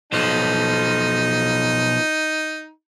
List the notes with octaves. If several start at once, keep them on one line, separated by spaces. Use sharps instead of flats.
B1 F3 D#4